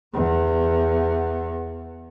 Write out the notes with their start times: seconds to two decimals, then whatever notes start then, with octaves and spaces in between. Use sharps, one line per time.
0.14 E2 B3